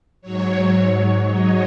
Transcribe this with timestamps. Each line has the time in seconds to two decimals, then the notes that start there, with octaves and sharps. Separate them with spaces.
0.22 G#2 F#3 C#5
1.26 D#5